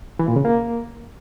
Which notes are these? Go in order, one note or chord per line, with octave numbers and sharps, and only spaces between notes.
E3
A#2
C#3
A#3